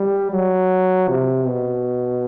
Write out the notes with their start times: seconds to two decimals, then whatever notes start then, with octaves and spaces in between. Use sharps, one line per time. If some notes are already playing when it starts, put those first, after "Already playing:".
Already playing: G3
0.31 F#3
1.08 C3
1.46 B2